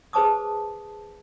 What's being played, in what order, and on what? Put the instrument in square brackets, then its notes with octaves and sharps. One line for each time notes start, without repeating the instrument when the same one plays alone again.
[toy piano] G#4 B4 C5 A5 D6 D#6